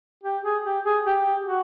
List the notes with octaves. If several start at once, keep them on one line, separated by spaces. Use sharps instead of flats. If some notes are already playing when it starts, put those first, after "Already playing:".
G4
G#4
G4
G#4
G4
F#4